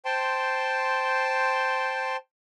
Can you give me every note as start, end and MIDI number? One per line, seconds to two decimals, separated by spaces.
0.05 2.17 72
0.05 2.17 79
0.05 2.17 81
0.05 2.17 84